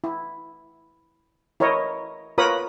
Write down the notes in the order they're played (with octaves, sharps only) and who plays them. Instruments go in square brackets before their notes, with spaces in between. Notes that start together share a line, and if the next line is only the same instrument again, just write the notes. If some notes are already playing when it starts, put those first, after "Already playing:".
[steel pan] E4
E4 A#4 C#5 D#5
F4 A#4 B4 C#5 B5 D#6